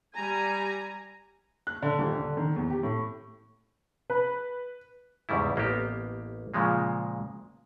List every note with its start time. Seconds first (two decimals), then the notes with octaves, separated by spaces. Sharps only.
0.16 G3 G#5 A#5
1.67 F#6
1.83 D3
1.99 D#1
2.14 D3
2.37 D#3
2.56 E2
2.70 G4
2.83 A2
4.10 B4
5.29 E2 G#2 C#3 G3 E4
5.56 A1 A#3 B3 G4
6.54 A#2 C#3 F3 G#3 A#3